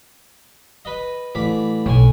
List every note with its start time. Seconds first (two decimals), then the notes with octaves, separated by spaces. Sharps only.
0.85 B4 D#5
1.35 A1 B5 D6
1.86 B1 A2 G#5